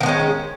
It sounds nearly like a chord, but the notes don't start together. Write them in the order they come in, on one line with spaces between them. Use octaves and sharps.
D#3 B3 G#3 C#4